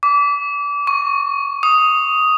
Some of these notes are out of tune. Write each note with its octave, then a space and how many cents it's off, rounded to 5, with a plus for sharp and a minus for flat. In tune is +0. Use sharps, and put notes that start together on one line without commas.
D6 -30
C#6 +5
D#6 +5